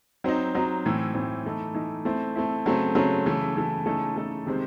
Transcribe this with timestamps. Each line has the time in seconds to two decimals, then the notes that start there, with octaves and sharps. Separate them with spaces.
0.24 F#3 C4 D#4
0.55 F#3 C4 D#4
0.85 A2 E3 C4
1.14 A2 E3 C4
1.45 E3 A3 D#4
1.75 E3 A3 D#4
2.05 A3 C4 E4
2.36 A3 C4 E4
2.66 C#3 F#3 A3 C4
2.95 C#3 F#3 A3 C4
3.26 C#3 E3 A3
3.56 C#3 E3 A3
3.86 C#3 E3 A3 D#4 A4
4.16 C#3 E3 A3 D#4 A4
4.46 C3 D#3 G#3 C4